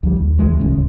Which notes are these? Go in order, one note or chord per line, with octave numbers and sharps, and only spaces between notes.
D2 F3 G3
D#2
C#2 E3 G#3
D1 C2 C#3